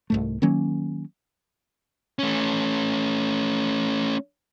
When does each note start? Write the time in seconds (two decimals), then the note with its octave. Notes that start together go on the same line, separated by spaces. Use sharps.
0.10 C2 G#2 A3
0.42 D#3 F#3 A#3 C#4
2.19 A3 C#4